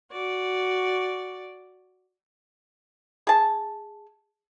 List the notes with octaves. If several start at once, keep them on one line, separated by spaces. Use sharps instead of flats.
F#4 D5
G#4 A5